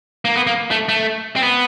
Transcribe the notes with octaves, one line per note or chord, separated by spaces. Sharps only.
A#3
B3
A#3
A3
A3
C4
B3